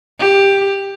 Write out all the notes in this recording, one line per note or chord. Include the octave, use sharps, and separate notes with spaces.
G4